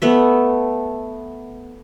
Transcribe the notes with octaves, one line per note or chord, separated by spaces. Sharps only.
A3 B3 E5